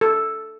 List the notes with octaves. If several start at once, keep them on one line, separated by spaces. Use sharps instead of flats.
A4